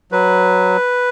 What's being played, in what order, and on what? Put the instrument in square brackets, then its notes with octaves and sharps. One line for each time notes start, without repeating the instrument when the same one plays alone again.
[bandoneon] F#3 B4